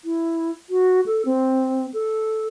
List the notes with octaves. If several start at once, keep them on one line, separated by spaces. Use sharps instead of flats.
E4
F#4
A4
C4
A4